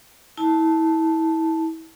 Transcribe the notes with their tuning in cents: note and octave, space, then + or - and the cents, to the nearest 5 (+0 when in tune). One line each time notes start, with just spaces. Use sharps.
E4 -30 A5 +0